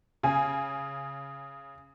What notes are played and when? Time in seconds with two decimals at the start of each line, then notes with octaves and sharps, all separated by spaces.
0.23 C#3 G#5